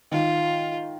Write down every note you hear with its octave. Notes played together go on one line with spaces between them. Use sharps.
D#3 F4